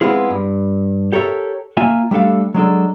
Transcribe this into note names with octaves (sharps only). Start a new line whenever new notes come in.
G#3 B3 C4 E4 F4 G#4
G2
G4 A4 A#4 C#5 E5
A#3 F4 E5 G#5
G3 A3 D4 A4 F5
F#3 G#3 D4 A4